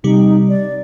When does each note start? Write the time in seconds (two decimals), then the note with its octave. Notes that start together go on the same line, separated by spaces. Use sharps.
0.04 C3 G3 D#4 G4
0.49 D5